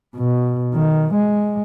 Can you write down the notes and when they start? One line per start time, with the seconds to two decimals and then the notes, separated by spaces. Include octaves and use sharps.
0.16 B2
0.74 D#3
1.14 G#3